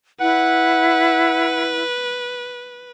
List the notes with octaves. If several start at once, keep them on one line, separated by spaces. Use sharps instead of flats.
E4 B4 F#5